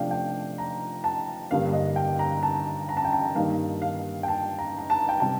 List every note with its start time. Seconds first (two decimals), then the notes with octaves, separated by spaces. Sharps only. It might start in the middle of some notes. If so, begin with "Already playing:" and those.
Already playing: C3 F3 A3 D4 F5 G5
0.11 G5
0.58 A#5
1.04 A5
1.51 G2 D3 G3 A#3 F5
1.69 F5
1.73 D#5
1.96 G5
2.19 A#5
2.43 A5
2.89 A#5
2.97 A5
3.05 G5
3.13 A5
3.35 G2 D#3 A#3 F5
3.82 F5
4.23 G5
4.28 A5
4.59 A#5
4.78 A#5
4.90 A5
5.09 G5
5.20 C3 G3 A5